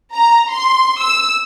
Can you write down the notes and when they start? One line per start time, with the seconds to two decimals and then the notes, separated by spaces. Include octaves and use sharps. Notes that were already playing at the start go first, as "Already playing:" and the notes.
0.14 A#5
0.51 C6
1.02 E6